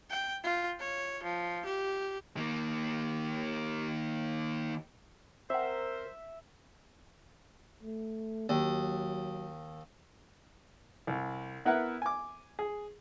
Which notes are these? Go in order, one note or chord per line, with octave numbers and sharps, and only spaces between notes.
G5
F4
C#5
F3
G4
D#3 A#3
C4 A#4 C5 E5 F#5
A3
D#2 F#3
C2
B3 E4 A#4 B4 E5 F#5
G#5 D6
G#4